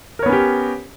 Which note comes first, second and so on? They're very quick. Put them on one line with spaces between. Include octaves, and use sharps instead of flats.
A#4 C#5 B3 C#4 G4